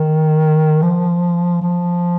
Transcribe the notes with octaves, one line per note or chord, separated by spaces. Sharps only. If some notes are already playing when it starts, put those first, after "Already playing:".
Already playing: D#3
F3
F3